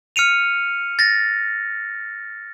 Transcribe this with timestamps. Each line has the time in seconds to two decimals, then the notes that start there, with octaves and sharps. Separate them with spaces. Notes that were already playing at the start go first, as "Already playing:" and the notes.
0.16 F6 C#7 D#7 F7
0.99 A6 A#6